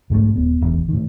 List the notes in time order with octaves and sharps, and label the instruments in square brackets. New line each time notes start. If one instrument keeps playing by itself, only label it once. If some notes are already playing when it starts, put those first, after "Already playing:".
[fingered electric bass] B1 G#2 E3 A3
D#1 B3
E1 A1 E2
A2 D#3